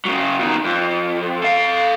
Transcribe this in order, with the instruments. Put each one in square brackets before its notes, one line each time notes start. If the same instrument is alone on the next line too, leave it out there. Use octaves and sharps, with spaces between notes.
[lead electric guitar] C#3 F#3
E2 D#3
F2
A4 F5